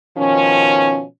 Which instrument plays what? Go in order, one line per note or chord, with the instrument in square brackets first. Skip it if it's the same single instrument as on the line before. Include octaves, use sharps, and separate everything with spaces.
[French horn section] B2 D#3 F3 C#4